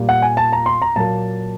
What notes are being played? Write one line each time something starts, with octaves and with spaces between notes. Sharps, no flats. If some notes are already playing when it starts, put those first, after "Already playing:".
Already playing: A#2 G3 A#3
F#5
G#5
A5
A#5
C6
A#5
A#2 F#3 A#3 A5